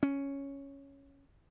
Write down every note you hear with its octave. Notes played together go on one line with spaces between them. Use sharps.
C#4